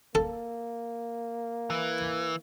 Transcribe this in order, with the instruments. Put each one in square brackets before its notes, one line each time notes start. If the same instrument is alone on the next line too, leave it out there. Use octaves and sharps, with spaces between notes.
[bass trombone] A#3 [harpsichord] A4
[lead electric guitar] E3